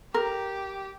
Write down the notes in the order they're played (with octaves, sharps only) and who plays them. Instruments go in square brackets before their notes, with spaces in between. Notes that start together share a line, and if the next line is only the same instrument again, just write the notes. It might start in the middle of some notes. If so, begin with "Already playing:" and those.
[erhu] G4 [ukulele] A#4